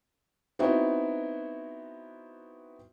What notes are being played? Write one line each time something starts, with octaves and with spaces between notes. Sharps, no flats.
B3 C4 D#4 E4 F#4